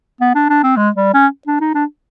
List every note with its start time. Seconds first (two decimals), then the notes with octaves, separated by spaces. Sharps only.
0.21 B3
0.35 D4
0.50 D4
0.63 C4
0.77 G#3
0.96 G3
1.14 C#4
1.47 D4
1.61 D#4
1.75 D4